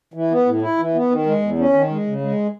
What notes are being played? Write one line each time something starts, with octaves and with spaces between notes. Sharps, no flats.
E3
B3
A2
E4
E3
B3
D#3
G#3
E2
C#4
D#3
G#3
C#3
G#3